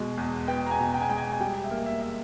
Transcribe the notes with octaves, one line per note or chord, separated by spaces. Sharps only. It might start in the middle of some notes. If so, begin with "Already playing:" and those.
Already playing: B2 G#3
E2
B3 G5
A#5
G#5
B2
G5
G#5
G#3 G5
G#5
G#5
G3 G5
E5
A#3
E5
E5